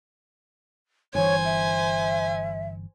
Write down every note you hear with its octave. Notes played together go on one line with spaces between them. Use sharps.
G1 E3 C5 C#5 G#5
E5